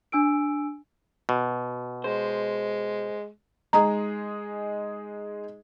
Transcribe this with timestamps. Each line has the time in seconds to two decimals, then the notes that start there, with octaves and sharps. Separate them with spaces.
0.12 D4 G#5 E6 D7
1.29 B2
2.04 G#3 C5
3.73 G#3 D#4 G#4 A#5